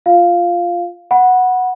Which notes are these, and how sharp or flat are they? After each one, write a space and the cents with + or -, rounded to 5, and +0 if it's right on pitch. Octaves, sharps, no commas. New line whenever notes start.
F4 +0 F5 +0
F#5 -5 B5 -20